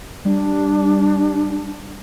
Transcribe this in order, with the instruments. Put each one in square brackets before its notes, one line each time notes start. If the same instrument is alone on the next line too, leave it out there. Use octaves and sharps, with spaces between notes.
[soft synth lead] G3 [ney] D4